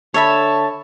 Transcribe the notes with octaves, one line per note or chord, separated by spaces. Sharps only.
D3 C#5 E5 A5 B5